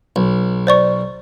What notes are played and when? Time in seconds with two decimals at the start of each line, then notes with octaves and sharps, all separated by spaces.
0.16 B1
0.67 C5 D5 C#6